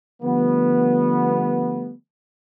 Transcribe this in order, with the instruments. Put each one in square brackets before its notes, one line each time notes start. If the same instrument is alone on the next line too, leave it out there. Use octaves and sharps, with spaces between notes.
[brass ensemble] D3 F3 G3 A3 B3